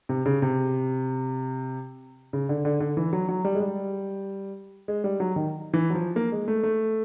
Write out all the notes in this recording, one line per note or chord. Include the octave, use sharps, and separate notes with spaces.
C3
C#3
C3
C#3
D3
D3
D3
E3
F#3
F#3
G3
G#3
G3
G#3
G3
F#3
D#3
E3
F#3
F3
A#3
G#3
A3
A3